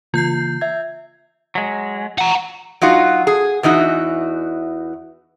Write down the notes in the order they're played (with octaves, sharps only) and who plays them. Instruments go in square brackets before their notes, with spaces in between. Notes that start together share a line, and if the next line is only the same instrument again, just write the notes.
[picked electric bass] C#3 E3 A#3 [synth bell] F4 G6 C7
[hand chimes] E5 G#6
[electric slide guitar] F#3 G#3
[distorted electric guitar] F#5 A#5
[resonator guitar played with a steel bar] F#3 D#4 F4 F#4
G#4
E2 E3 D#4 F#4